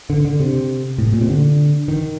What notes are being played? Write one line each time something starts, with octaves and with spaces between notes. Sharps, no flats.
D3
D3
C3
A2
A#2
C3
D3
D#3